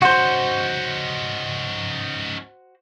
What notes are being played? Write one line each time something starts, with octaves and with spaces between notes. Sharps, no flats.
C#4 D#4 F#4 C5